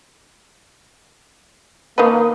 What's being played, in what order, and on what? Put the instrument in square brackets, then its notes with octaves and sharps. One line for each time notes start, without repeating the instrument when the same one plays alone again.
[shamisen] D#3 D#4 B4 [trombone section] A#3